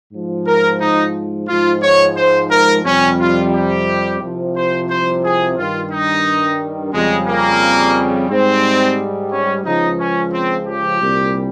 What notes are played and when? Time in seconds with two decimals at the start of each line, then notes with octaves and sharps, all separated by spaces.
0.12 G#2 F3
0.47 A#4
0.81 D#4
1.48 G#2 F3 F4
1.82 C#5
2.17 C5
2.51 A#4
2.84 F2 C3 G3 C#4
3.19 F4
3.53 G4
4.21 C2 C3 F3
4.56 C5
4.89 C5
5.24 G#4
5.57 G2 D#3 G3 F4
5.91 D#4
6.93 F2 C#3 G3 G#3
7.27 A#3
8.29 G#2 G3 C4
9.31 C#4
9.65 C#2 C#3 F3 D#4
9.99 C#4
10.33 C4
10.68 G4
11.01 C2 A#2 G3